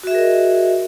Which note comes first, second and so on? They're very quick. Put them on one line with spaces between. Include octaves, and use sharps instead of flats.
F#4 E5 G#4 A#4 D#5